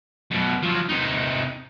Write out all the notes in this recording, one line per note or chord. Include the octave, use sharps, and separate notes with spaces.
F#2 B2
F3 F#3
C3 D#4